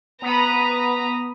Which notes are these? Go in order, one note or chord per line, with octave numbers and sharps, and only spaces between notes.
B3 B4 A#5 B5 D#6